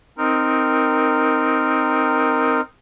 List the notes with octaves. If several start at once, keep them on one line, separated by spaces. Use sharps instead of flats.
C4 D#4 A#4